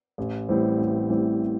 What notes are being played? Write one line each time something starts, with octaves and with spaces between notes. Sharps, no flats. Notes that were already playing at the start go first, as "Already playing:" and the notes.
A1
A2 E3 G3 C4
A1
A2 E3 G3 C4